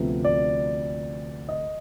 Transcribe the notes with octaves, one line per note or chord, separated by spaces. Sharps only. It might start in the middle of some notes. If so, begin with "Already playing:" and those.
Already playing: D2 C3 F3 B3
D5
D#5